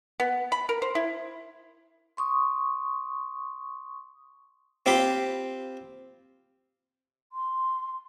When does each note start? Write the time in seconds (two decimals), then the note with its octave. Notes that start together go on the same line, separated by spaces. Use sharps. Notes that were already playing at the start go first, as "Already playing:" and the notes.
0.20 B3
0.52 B5
0.69 A#4
0.82 C5
0.95 E4
2.17 C6 C#6 D#6
4.86 C4 F4 G4 B5 C6
7.31 C6